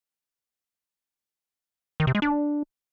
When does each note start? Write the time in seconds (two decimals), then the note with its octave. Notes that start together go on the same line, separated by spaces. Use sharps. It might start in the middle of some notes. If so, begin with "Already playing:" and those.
2.00 D#3
2.07 C3
2.15 G#3
2.22 D4